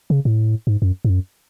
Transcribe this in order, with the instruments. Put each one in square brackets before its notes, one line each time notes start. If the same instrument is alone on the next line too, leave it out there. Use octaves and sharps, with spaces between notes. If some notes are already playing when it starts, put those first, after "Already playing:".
[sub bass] C#3
A2
G#2
F#2
G#2
F#2